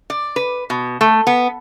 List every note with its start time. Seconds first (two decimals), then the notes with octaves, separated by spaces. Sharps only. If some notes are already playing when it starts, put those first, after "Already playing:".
0.10 D5
0.36 B4
0.70 B2
1.01 A3
1.27 B3